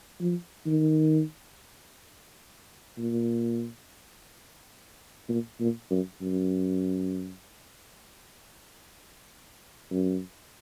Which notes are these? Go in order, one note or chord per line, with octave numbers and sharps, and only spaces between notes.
F3
D#3
A#2
A#2
A#2
F#2
F#2
F#2